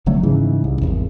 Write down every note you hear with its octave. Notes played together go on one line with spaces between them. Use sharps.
G1 D3 F#3 A3
G#2 C#3 E3
C2
G#1 E2